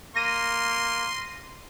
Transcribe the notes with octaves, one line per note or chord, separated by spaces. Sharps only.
A#3 C6 A#6 D#7